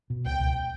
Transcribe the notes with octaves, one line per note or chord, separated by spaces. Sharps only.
B2
C#2 G5
C#2